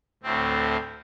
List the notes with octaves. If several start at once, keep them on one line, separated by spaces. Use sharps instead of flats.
D2 A2 C4